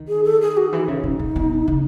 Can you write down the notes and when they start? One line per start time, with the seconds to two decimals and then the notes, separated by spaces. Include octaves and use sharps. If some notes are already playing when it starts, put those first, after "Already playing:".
Already playing: D#3
0.08 G#4
0.24 A4
0.41 G#4
0.57 F#4
0.73 E3 D#4
0.88 C#3
1.03 B2
1.19 B2
1.36 B2
1.68 C#3